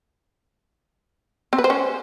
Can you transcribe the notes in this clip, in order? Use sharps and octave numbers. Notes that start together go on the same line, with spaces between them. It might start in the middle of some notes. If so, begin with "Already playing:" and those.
C4
B4
C5
C#4